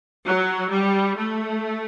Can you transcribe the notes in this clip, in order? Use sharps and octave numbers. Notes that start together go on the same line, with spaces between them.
F#3
G3
A3